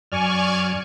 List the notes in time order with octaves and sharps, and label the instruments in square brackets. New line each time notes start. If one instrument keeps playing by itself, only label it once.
[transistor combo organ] F#2 F6 [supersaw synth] D5 G#5 C#6